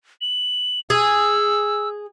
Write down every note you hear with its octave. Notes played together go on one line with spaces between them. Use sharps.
F#7
G#4 E6